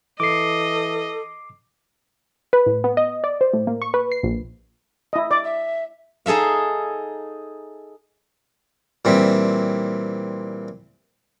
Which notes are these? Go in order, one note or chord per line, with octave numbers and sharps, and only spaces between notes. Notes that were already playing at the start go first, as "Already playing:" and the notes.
E3 A4 D#5 D6 C7
B4
A2
B3
D#5
D5
C5
A2
A#3
C#6
B4
C7
A#1
E4 D#5
D5 D6
E5
D#4 G#4 A4 E5 F5
A#2 E3 G3 C4